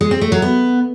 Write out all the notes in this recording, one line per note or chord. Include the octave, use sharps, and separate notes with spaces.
G#3
C4
A3
F#3
B3